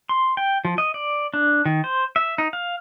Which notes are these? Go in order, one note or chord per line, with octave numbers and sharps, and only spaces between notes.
C6
G5
F3
D#5
D5
D4
D#3
C5
E5
D#4
F5